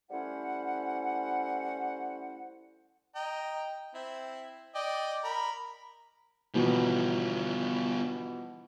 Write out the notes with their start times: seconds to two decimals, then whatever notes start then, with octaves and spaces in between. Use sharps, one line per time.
0.10 G3 A3 C#4 E4 C5 F#5
3.15 D#5 G5 A#5
3.94 C4 E4
4.75 D5 D#5 G5
5.24 A#4 B5
6.54 B2 E3 F3 G3 B3